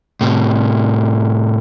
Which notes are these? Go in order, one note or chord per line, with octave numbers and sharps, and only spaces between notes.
A2 C3